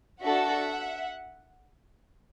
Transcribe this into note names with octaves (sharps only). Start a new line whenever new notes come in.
D4 F#4 A4 E5 F#5